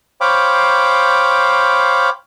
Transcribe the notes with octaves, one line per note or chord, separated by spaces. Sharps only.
C5 C#5 F5 G5 B5 D6